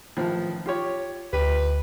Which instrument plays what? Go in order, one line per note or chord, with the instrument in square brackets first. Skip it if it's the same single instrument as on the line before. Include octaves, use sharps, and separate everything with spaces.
[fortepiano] A1 D#3 F3
F4 G4 C#5
[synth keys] D2 [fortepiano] G4 [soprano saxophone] B4